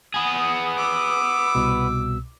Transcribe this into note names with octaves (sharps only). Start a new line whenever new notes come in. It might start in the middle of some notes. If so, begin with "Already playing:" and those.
B3 G#4 D#6
D6 E6
C2 B2